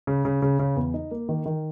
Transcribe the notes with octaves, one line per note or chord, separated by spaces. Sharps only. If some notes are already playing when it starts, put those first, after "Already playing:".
C#3
C#3
C#3
C#3
E2
D#4
A#3
D#3
D#3